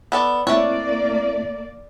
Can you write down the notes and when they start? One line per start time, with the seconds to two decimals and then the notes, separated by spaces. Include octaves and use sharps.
0.12 B3 A4 D5
0.47 A3 A#3 C4 E4 C#5 D5 F#6